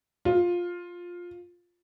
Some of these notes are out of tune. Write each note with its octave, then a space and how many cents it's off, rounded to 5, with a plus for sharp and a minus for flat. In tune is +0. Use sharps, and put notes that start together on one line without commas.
F4 +10